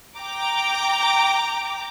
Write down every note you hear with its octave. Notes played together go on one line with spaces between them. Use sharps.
G5 A#5 D6